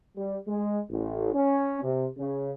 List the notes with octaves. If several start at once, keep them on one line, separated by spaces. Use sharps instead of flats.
G3
G#3
A1
C#4
C3
C#3